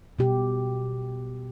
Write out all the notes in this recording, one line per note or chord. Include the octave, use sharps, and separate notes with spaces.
B2 G4